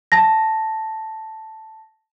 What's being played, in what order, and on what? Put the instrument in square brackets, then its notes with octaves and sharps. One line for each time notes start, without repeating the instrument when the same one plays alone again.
[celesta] A5 A#6